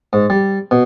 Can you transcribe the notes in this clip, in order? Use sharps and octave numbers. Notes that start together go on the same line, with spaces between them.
G#2
G3
B2